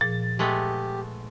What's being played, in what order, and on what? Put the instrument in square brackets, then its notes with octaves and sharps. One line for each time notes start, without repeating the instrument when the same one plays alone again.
[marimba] A#2 F3 G#4 [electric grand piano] A6
[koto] G#3 A3 B3 [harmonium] G4